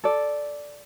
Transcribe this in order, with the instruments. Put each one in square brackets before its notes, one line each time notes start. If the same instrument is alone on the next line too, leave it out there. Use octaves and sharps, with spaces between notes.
[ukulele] A4 D5